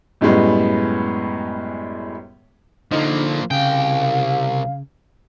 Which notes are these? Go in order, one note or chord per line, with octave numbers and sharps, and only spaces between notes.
F#2 A2 G3 G#3 B3
D3 F3 A#3 D#4
C2 C#3 F5 G5